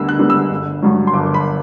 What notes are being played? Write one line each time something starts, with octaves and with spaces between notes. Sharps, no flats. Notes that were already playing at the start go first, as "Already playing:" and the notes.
Already playing: D2 D3 G3 B3 E6
F#6
D3 G3 B3
E6
G1
G2 F#3
C6
G1 D6
B5